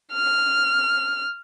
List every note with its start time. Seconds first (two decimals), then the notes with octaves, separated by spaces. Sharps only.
0.13 F6